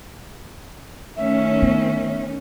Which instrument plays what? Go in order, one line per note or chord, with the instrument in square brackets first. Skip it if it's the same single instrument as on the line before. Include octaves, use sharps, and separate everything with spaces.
[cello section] D#3 C#4 [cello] A3 [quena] E5
[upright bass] B3